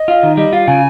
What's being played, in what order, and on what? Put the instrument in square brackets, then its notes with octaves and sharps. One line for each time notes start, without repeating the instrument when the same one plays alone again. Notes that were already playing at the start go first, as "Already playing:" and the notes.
Already playing: [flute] D#5
[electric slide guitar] F4
D#3
[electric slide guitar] G3 [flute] D#5
[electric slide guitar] F4 [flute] F5
[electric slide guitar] C#3 [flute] G#5